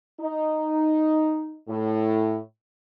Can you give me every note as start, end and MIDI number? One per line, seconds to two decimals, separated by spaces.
0.21 1.58 63
1.69 2.37 45